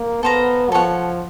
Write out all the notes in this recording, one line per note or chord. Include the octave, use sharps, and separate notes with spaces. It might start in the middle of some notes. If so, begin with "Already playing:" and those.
Already playing: A#3
B3 A4 C5 F5 A#5
F3 A4 C#5 F#5